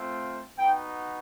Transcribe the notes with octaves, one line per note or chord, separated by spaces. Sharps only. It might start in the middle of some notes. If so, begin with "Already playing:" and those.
Already playing: A3 C4 F4
B3 D#4 F#4 G5